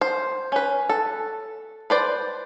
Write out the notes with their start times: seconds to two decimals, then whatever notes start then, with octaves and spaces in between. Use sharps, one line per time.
0.01 C5
0.52 C#4 B4
0.89 A4
1.90 B4 C5 D5